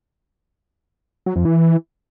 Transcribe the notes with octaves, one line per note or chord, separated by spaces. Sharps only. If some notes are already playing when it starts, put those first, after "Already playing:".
F#3
F2
E3